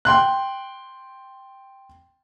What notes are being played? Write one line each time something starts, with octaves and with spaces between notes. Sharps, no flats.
G5 C6 F#6